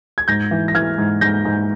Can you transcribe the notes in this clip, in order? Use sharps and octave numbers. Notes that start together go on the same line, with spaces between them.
G#6
G#2 G6 A#6
E3
A#6
E3 F6 G#6
G#2
G#2 G6 A#6
G#2